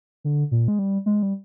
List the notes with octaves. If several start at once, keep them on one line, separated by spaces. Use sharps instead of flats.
D3
A#2
G#3
G3
G#3
G3